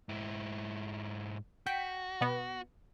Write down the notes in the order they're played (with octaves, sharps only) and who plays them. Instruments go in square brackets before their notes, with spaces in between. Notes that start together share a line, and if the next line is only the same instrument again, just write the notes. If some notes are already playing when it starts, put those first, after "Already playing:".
[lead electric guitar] G#2 E4
[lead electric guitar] F#4 [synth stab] G5 B6
[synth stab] B2 B3